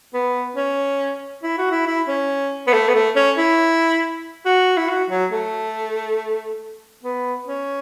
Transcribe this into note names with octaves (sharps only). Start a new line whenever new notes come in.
B3
C#4
E4
F#4
E4
E4
C#4
B3
A3
B3
A3
C#4
E4
F#4
E4
F#4
F#3
A3
B3
C#4